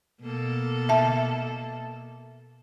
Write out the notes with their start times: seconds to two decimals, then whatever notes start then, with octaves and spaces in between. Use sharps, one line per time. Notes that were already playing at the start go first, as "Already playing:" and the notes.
0.22 B2 A#3 A4
0.89 E5 A5